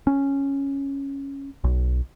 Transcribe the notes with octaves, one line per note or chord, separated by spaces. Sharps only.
C#4
B1